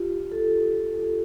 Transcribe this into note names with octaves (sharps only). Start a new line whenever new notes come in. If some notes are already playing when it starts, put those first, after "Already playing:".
Already playing: F4 G4
A4